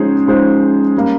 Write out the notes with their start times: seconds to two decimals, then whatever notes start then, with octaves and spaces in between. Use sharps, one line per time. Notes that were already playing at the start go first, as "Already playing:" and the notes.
Already playing: F3 G#3 C#4 D#4 G#4 C5
0.27 F3 G#3 D#4 G#4 C5
0.97 G3 A#3